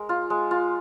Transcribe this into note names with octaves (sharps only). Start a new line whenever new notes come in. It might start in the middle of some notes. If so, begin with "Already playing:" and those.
Already playing: G#3 A#4
F4
G#3
F4